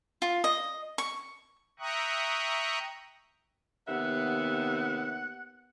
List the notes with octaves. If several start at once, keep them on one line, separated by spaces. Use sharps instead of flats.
F4
D#5
C#6
E5 G5 A#5 C#6 D#6 F#6
D#2 C3 B3 E5 F#5